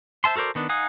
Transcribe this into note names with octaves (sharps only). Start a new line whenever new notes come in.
C5 E5 A5 C6
F#4 A4 A#4 C5 D5
D#3 B3 D4
D#4 F5 F#5 G#5 D#6